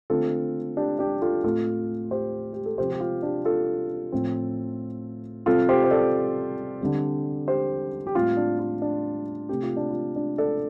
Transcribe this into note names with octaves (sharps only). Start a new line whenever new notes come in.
D3 A3 C4 F4 A4
D4 G4
D4 G4
F4 A4
A2 A3 C4 F4 A4
G4 C5
G4
A4
C3 F3 C4 G4 C5
G4
F4
D4 G4
F4 A4
A2 F3 A3 C4
C3 G3 C4 F4 A4
G4 C5
C5
A4 D5
D3 G3 C4
G4 C5
G4
A2 G3 C4 F4
D4
F4
D4
C3 A3 C4 G4
F4
D4
F4
D4
A4 D5